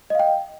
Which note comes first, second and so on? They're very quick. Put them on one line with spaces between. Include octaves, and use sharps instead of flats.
D#5 F5 G5